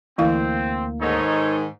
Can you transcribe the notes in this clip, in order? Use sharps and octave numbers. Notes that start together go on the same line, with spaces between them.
D2 E3 A#3 C4 E4 F5
G#2 D#3 D#4 A4 C#5